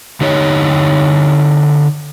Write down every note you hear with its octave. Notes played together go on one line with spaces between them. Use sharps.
D3 D#4 G4 C#5 D#5